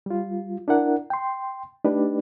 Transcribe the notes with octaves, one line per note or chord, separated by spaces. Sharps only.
G3 F4
D4 E4 A#4 F#5
G5 C6
A3 D4 D#4 G4 B4 D5